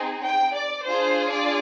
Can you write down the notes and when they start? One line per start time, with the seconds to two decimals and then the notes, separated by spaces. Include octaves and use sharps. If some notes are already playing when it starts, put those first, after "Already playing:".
Already playing: C4 D#4 G#4
0.24 G5
0.55 D5
0.85 D4 F4 G#4 C5
1.31 D5